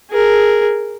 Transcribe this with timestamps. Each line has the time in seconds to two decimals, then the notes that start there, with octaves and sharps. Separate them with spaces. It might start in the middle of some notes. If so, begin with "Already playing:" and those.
0.10 G#4 A#4